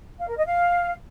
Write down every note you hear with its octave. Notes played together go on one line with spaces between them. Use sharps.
F5
A#4
D#5
F5